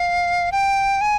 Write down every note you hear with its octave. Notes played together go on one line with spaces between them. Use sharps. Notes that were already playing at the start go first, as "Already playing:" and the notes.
Already playing: F5
G5
G#5